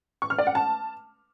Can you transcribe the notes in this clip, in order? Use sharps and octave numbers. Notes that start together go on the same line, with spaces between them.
C#6
F6
D5
F#5
A5